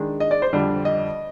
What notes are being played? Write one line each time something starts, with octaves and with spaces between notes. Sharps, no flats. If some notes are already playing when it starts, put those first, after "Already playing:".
Already playing: D#3 G#3 D4
D#5
D5
C5
F2 D3 G3 D4
D#5